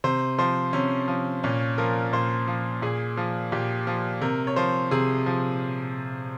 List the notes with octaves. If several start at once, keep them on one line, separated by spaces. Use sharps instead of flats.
C3 C5
F3 C5
C3 C#4
F3
A#2 C#4
F3 A#4
A#2 C5
F3
A#2 G#4
F3
A#2 G4
F3
C3 A#4
C#5
F3 C5
C3 G#4
F3